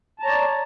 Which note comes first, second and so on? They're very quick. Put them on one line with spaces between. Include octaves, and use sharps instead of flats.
A5 A#5 C#5 D5